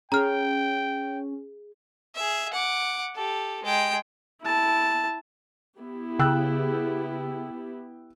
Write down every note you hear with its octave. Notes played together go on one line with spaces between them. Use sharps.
C#4 G#4 A#4 C#5 G5 A#5 F6
G#4 E5
F#5 D6
G4 A4
G#3 G5
E4 A5
B3 E4 G4
C#3 G5 E6 F#6